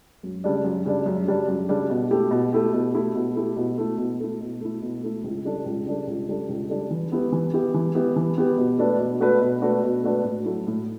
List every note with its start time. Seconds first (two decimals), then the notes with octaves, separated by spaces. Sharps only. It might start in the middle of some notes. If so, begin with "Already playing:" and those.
0.23 F#2
0.44 C#3 G3 D4
0.64 F#2
0.85 C#3 G3 D4
1.06 F#2
1.27 C#3 G3 D4
1.48 F#2
1.69 C#3 G3 D4
1.90 B2
2.10 A3 E4 G4
2.31 B2
2.53 A3 E4 G4
2.73 B2
2.94 A3 E4 G4
3.15 B2
3.35 A3 E4 G4
3.57 B2
3.78 A3 E4
3.98 B2
4.20 A3 E4
4.41 B2
4.61 A3 E4
4.82 B2
5.03 A3 E4
5.24 C#2
5.45 C#3 G3 D4 A4
5.65 C#2
5.86 C#3 G3 D4 A4
6.07 C#2
6.28 C#3 G3 D4 A4
6.49 C#2
6.69 C#3 G3 D4 A4
6.91 E3
7.12 B3 E4 G4
7.32 E3
7.54 B3 E4 G4
7.74 E3
7.95 B3 E4 G4
8.16 E3
8.37 B3 E4 G4
8.58 B2
8.78 A3 D4 F#4 B4
8.99 B2
9.20 A3 D4 F#4 B4
9.40 B2
9.62 A3 D4 F#4 B4
9.83 B2
10.03 A3 D4 F#4 B4
10.24 A2
10.45 F#3 A3 E4
10.67 A2